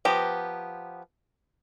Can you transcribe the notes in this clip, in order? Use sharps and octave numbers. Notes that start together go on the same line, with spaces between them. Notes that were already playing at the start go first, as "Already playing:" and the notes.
F3 B3 G4 A#5